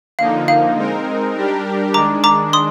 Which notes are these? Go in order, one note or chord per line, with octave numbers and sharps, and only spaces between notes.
D3 F3 A#3 D#4 F5
F5
G#3 C4 D#4 A#4
G3 D4 G4 A#4
D#3 G#3 D4 A#5 D6
A#5 D6
C6 D#6